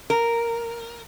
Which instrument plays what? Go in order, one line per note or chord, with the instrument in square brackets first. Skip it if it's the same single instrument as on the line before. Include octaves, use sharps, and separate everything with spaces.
[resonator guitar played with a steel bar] A#4